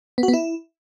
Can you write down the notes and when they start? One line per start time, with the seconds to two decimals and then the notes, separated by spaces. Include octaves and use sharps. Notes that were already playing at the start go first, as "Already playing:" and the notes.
0.18 B3
0.23 F#4
0.28 B3
0.33 E4